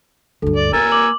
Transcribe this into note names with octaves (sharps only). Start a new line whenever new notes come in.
D2 G2 A4
D5
A#3 A#4 G#5 E6 A6
D6 F#7